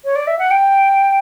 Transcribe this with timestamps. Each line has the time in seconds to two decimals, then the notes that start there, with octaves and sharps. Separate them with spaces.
0.04 C#5
0.15 D5
0.27 E5
0.39 F#5
0.51 G5